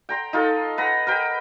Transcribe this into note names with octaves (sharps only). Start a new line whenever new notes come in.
G5 A#5 C6
D#4 F4 A4
B4 F#5 A#5
A#4 B4 G5